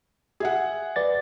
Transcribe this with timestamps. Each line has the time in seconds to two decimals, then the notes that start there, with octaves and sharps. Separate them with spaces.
0.40 G#4 E5 F#5
0.96 B4 D5 A6